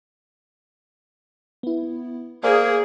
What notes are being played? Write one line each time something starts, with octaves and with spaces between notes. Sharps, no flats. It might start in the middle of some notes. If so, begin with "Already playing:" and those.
B3 E4
A#3 G#4 C5 D5 G#5